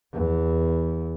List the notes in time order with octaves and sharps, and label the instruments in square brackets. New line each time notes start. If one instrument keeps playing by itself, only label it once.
[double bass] E2